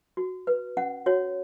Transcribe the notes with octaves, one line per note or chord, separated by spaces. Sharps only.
F#4
B4
C#4 F#5
F#4 C#5